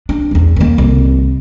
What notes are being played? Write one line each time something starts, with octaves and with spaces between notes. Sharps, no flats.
D4
A#1 E2
D#3 A#3
C2